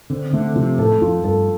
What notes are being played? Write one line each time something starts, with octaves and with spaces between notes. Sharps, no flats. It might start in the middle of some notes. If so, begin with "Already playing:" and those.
D3 C4
D3 A3
C3 F3
A2 A4
F2 F4
G2 A4